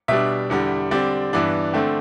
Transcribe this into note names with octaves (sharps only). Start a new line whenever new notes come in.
B2 G3 D4 E5
E2 D3 G3
D3 G3 C4 D5
G2 E3 B3 D4
D3 A3 C4